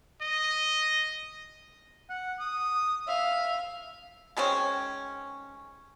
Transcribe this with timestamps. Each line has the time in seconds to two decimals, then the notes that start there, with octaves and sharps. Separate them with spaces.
0.21 D#5
2.10 F#5
2.40 D#6
3.08 E5 F5
4.37 D#3 G#3 C4 C#4